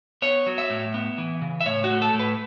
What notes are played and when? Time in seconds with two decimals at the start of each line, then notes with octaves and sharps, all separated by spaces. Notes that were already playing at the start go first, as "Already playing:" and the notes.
0.22 B3 C#5
0.46 F#3
0.58 E5
0.70 A2
0.94 B3
1.18 E3
1.41 C#3
1.61 E5
1.66 A2 C#5
1.84 F#4
1.90 A3
2.02 A4
2.13 A2
2.19 B4